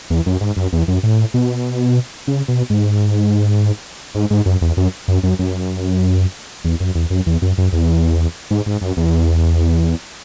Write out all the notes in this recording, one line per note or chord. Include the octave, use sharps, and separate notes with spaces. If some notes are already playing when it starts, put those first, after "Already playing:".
E2
F#2
G#2
F#2
E2
F#2
A2
B2
C#3
B2
G#2
G#2
G#2
F#2
E2
F#2
F#2
F#2
F#2
E2
F#2
E2
F#2
E2
F#2
F#2
E2
G#2
G#2
F#2
E2